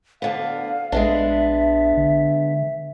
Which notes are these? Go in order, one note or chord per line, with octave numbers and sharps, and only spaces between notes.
D2 D3 B3 F5
A#1 G#3 B3 D4 E5
D3